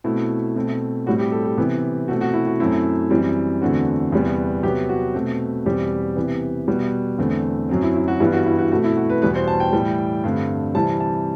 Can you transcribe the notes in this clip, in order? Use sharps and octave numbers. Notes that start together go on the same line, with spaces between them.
B2 A3 C4 E4
B2 A3 C4
A2 G3 C4 F#4
G4
A4
G4
C3 E3 B3
B2 A3 C4 F#4
F#4
E4
F#4
F#2 F#3 A3 C4 E4
F#2 E3 G3 C4
E2 D3 A3 C4 F#4
E2 C3 G3 B3
C3 F#3 B3 G4
F#4
B2 A3 C4
E2 B2 G3 C4 G4
C3 E3 B3
B2 G3 B3
E2 D3 A3 C4
F#2 F#3 C4
E4
E4
F#4
G2 E3 G3 B3 E4
F#4
E4
F#4
B2 A3 C4 F#4
E4
F#4
B4
E2 B2 G3 B3 B4
C5
A5
G5
A2 E3 G3
G2 D3 A3 C4
C3 E3 G3 C4 A5
A5